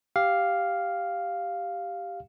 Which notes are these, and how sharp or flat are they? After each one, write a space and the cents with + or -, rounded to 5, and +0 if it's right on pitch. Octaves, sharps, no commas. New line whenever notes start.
G4 +0 F5 +0